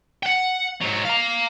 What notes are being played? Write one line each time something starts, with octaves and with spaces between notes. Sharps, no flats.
F#5 G5
G#2 F#3
F5 A#5